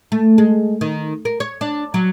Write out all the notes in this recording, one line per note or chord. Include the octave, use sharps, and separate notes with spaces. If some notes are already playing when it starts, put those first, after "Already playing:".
A3
G#3
D#3
A#4
C#5
D4
F#3